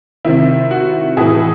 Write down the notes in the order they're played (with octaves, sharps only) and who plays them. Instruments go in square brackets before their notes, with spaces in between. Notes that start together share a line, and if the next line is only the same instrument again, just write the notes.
[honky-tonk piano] C3 D#3 E4
F#4
A2 E3 G#4